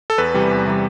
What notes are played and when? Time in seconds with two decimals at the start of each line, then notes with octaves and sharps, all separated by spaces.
0.10 A4
0.18 E2 B4
0.34 C3 E3 G3
0.51 E2
0.66 C3 E3 G3